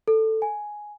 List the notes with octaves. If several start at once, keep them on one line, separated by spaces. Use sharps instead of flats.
A4
G#5